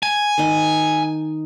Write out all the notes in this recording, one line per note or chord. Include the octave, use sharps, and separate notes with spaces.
G#5
D#3 D#4